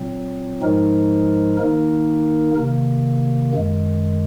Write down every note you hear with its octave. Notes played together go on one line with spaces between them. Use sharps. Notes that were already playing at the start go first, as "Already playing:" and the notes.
Already playing: A#2 F#3 C4
G#2 F3 G#3 D#4 A#4
D#3 A#3 D#4 A#4
C3 D#3 A#3
F#2 D#3 G#3